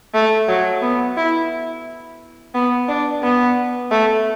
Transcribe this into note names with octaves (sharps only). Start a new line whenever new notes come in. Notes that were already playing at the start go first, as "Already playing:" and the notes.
A3
F#3
B3
E4
B3
D4
B3
A3